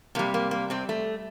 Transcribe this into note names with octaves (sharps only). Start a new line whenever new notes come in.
C3 G3 A#3
A#3
A#3
C3 C4
A3